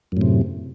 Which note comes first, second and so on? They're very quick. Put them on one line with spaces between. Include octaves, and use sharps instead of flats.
F#2 A2 C3